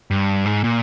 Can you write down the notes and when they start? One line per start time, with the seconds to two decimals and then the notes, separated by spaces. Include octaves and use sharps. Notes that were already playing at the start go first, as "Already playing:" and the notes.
0.11 G2
0.46 G#2
0.64 A#2